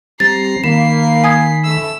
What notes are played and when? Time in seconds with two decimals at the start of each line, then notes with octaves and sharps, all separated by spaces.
0.20 G3 C4 A#5 A6 C7
0.64 D#3 A#3 B5 C7 E7
1.24 G#5 D#6 G#6
1.65 A3 E6